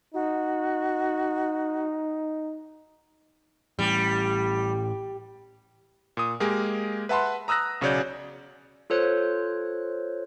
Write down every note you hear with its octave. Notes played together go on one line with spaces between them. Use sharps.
D#4 F#4
A2 E3 G3
A#2 D#6
G#3 A#3 G4 G#4 A#4
B4 E5 F#5 A5 B5 C6
A#5 D#6 E6 F#6 A#6
B1 C#3 F#4 C#5 D5 G6
F4 A4 C5 C#5 F#6